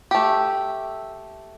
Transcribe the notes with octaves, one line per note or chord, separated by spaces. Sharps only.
A3 G4